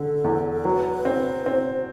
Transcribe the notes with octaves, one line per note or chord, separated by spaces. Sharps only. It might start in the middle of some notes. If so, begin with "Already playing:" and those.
Already playing: D3 A4
E2
F#3 B4
C4
C4 C5